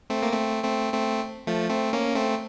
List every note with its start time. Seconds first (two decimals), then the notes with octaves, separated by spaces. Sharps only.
0.10 A3 C4
0.23 A#3
0.33 A3 C4
0.64 A3 C4
0.93 A3 C4
1.47 F3 A3
1.70 A3 C4
1.93 A#3 C#4
2.15 A3 C4